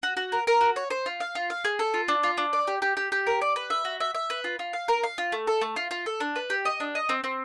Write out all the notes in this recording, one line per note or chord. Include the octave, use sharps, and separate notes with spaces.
F#4
F#4
A#4
A#4
F#4
C#5
C5
F4
F5
F4
F5
G#4
A4
F4
D4
F4
D4
D5
G4
G4
G4
G4
A#4
D5
B4
E5
F#4
E5
E5
B4
F4
F4
F5
A#4
F5
F4
A3
A4
A3
F4
F4
A4
D4
B4
G4
D#5
D4
D#5
C4
C4